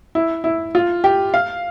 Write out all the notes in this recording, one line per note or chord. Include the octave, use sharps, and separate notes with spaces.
E4
E4
F4
G4
F5